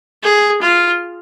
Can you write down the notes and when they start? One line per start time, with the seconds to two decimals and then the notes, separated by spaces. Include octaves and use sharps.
0.23 G#4
0.62 F4